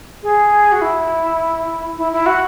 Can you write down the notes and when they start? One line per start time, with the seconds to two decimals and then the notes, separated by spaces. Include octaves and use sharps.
0.23 G#4
0.72 F#4
0.81 E4
1.98 E4
2.13 E4
2.26 F#4